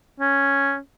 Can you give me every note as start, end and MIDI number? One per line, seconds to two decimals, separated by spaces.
0.20 0.78 61